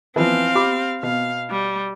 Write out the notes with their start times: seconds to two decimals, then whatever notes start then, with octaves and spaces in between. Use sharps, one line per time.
0.16 E3 F3 C4 F5
0.55 G4 B5 D6
1.03 B2 F5
1.50 G3